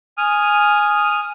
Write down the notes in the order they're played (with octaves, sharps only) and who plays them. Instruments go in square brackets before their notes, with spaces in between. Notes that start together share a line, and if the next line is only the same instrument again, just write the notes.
[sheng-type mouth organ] G#5 D#6 F6